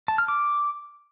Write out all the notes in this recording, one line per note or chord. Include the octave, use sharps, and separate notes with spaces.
A5
F6
D6